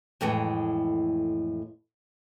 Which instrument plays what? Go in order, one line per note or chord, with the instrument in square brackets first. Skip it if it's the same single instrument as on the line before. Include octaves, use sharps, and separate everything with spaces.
[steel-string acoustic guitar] F2 A2 E3 G#3